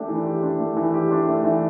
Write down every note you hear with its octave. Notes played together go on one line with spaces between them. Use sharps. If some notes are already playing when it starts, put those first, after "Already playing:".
Already playing: A3 D4 G4
E3
G4
D4
A3
E3
G4
D4
A3
E3